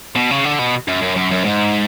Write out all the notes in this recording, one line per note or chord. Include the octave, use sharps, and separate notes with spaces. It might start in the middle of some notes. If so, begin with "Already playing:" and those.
B2
C#3
D3
B2
F#2
F#2
F#2
F#2
G#2